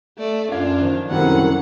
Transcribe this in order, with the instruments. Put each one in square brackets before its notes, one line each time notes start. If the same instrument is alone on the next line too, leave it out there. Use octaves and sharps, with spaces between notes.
[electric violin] A3 D5
[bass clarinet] F#2 [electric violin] D4 F4 [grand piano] D5 F5 G#6
[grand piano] D#3 F3
[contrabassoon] C2 [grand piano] F#2 D3 [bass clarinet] D#3 [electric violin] C#4 F#5